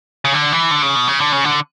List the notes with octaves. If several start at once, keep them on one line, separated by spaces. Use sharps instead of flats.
C#3
D3
E3
D3
C#3
B2
C#3
D3
C#3
D3